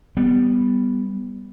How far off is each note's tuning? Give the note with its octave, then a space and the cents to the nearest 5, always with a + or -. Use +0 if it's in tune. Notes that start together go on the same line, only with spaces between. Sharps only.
G3 +0 B3 +0